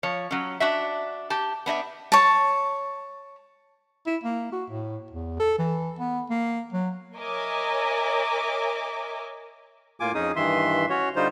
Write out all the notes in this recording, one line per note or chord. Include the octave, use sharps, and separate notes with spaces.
F3 C#5
F#3 C#4
D4 F#4 E5
G4 A5
B3 D4 D#5 E5
C#5 A5
E4
A#3
F#4
A2
E2
A4
E3
B3
A#3
F#3
A#4 C#5 D#5 E5 G#5 D6
A2 A#3 F4 G#5 D6
F2 C#4 D#4 G#4 D#6
G2 D#3 E3 E5 C6
C#4 F#4 C#5
D3 G3 D#4 F4 C5